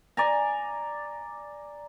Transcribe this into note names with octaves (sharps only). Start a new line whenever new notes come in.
D5 G#5 A#5